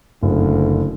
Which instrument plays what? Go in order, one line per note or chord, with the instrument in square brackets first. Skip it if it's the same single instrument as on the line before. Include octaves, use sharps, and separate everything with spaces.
[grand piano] F#1 [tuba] D2